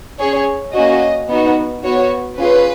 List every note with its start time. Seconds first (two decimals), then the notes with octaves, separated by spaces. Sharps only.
0.19 C#4 G#4 C#5
0.73 A#3 C#4 F#4 D#5
1.29 B3 D#4 F#4
1.83 B3 F#4 C#5
2.38 C#4 F4 G#4 B4